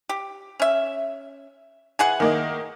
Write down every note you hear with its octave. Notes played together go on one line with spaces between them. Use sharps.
G4
C#4 E5
E3 G#4 F#5 G#5
D#3 A#3 D#4